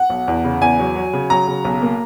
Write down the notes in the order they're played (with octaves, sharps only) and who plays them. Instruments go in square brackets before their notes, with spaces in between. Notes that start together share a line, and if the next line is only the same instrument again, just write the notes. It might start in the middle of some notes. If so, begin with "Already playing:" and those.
Already playing: [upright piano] F#5
B1
E2
C#3
E2 G#5
F#3
F#3
C#3
F#3 A#5
C#3
B1
A#3